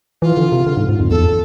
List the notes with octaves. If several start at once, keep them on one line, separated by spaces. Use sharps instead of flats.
E3 F4
D3
C3
D3
G#2
G#2
F2
E2 A4